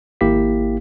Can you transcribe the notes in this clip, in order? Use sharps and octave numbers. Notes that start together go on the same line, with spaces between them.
G#1 A#3 E4 G4 F5 B6